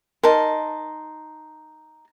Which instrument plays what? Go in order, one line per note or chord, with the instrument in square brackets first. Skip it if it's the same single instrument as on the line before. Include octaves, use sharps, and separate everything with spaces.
[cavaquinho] D#4 A5 C6 [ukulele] A#4